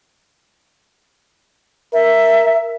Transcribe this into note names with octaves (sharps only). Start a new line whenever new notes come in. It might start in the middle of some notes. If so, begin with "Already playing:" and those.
A#4 E5